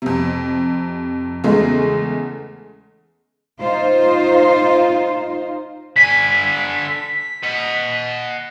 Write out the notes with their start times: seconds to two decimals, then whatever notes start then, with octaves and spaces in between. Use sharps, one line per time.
0.02 F2 C3
1.44 E2 C#3 G#3 A3
3.59 D#4 F4 C5
5.96 D3 G#5 B6
7.43 D#5 F#5